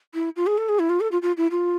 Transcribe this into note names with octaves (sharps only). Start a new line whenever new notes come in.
E4
F4
G#4
A4
G#4
E4
F4
A4
F4
F4
E4
F4